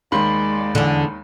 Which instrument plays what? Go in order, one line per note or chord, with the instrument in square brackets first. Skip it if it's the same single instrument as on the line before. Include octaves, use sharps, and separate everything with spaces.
[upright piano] D#2 D#3 C6 [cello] G#3 D5 [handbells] B5
[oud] E2 D3